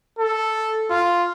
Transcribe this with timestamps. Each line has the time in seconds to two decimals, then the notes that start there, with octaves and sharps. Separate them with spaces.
0.19 A4
0.90 F4